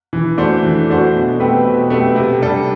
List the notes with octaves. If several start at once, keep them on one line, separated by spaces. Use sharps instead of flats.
E3
A3 D4 F#4 C5
E3
A3 D4 F#4 C5
B2
A3 C4 G4 B4
B2
A3 C4 G4 B4
C3
G3 D4 A4